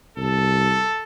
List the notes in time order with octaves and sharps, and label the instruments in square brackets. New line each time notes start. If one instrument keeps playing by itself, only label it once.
[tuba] C2 [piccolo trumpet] A4